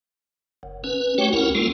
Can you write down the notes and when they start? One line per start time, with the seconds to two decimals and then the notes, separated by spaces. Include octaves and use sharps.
0.63 F#1
0.84 C#4 B4
1.18 A3 F#4 G4 C#5 G5
1.33 C#2 C#4 E4 A#4 F#5
1.55 G#3 A#3 F4 A4